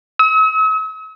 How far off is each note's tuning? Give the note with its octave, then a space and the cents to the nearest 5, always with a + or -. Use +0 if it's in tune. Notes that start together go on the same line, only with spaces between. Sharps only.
E6 -45